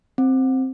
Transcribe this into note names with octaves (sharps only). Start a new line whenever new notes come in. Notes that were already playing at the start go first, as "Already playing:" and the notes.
C4